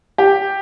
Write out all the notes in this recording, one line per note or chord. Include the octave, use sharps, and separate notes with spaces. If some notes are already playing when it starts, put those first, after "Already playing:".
G4